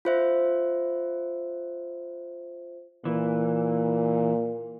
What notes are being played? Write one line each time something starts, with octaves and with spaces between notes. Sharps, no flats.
F4 C5 E5
A#2 E3